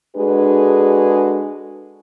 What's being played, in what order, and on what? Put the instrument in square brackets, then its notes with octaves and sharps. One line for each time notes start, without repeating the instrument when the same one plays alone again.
[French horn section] G#3 D4 F#4 G#4 A4 B4